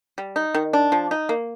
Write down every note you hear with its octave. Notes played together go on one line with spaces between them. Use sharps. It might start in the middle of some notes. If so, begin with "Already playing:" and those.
G3
D#4
D#3
D4
F3
D#4
A#3